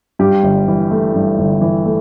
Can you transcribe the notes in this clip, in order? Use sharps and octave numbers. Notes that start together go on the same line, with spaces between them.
G2 G4
G1
E3
A3
G2
G1
E3
A3